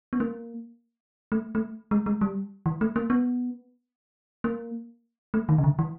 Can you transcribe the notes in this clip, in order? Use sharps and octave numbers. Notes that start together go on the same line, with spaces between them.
B3
A#3
A3
A3
G#3
G#3
G3
E3
A3
A#3
B3
A#3
A3
D#3
C#3
D3
E3